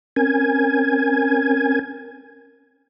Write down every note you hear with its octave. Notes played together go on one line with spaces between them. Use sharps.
C4 C#4 A#4 G#5 G#6